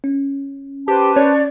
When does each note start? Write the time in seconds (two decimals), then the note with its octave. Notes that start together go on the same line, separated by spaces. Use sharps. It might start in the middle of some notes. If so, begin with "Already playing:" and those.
0.04 C#4
0.88 G4 B4 C5 A5
1.16 C#4 C#5 D5